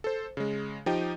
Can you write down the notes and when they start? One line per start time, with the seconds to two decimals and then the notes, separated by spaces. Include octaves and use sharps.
0.04 A4 C5
0.37 C#3 G#3
0.86 F3 D#4 G4 D#5 G5